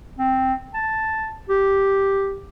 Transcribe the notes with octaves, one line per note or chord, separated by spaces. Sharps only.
C4
A5
G4